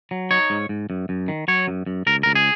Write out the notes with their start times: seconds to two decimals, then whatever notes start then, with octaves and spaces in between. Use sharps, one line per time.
0.11 F#3
0.31 D#4 C#5
0.50 G#2
0.69 G#2
0.90 F#2
1.09 F#2
1.28 D#3
1.48 F#3 C#5
1.68 F#2
1.86 F#2
2.07 C#2 A#4
2.23 C#2 A#4
2.35 G#4